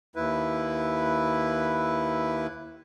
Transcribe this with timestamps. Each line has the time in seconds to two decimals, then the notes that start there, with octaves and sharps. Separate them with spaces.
0.16 D#2 E4 B4